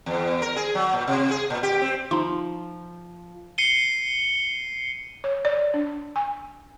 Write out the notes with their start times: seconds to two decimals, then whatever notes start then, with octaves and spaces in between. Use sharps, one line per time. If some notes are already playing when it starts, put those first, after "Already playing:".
0.06 E2
0.42 A#4
0.56 G#4
0.75 F#3
0.93 A#2
1.07 C3
1.31 G#4
1.50 A#2
1.63 G4
1.82 C4
2.11 F3 D#4 C6
3.58 C7 C#7 D#7 G7
5.24 C#5
5.45 D5
5.74 D4
6.16 G#5